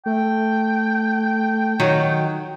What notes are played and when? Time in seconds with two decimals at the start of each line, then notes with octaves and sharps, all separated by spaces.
0.06 A3 G5
1.80 D#3 F#3